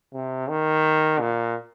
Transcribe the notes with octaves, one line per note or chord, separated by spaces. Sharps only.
C3
D#3
A#2